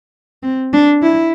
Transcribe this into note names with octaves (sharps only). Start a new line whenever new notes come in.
C4
D4
E4